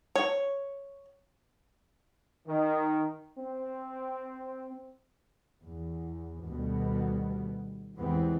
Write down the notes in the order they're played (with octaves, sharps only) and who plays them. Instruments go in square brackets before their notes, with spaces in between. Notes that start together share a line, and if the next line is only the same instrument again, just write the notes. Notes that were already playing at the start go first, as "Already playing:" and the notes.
[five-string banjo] C#5
[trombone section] D#3
C4
[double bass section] E2
D2 B2 D#3 G3 B3
E2 C3 E3 G#3 B3 C4